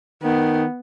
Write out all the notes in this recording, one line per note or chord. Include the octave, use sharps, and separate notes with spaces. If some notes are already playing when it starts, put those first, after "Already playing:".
D#3 B3